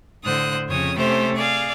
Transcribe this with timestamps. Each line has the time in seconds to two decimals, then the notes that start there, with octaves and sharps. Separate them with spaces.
0.24 A2 D3 C5 D#6 F#6
0.68 F2 C#3 C#5 D#6
0.97 C3 A3 C#4 G4 C5
1.35 G#4 D5 F5